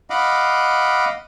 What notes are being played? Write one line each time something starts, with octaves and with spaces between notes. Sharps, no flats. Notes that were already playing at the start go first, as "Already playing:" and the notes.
D#5 F5 F#5 B5 D6